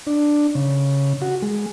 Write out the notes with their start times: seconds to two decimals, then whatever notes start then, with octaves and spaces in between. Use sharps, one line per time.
0.07 D4
0.55 C#3
1.22 F#4
1.42 G#3